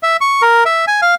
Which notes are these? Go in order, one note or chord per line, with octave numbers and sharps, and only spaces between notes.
E5
C#6
A#4
E5
G#5
F5